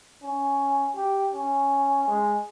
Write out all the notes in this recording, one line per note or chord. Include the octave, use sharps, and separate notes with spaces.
C#4
G4
C#4
G#3